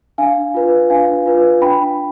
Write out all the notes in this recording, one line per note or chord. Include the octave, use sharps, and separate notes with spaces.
D4 F5 G#5
F4 B4
D4 F5 G#5
F4 B4
D4 G5 B5